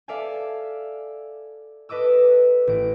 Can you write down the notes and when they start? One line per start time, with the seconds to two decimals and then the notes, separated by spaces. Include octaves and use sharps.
0.08 A4 D5 E5 F5 G#5
1.89 A4 B4 D#5 D6 E6
2.67 A1 D7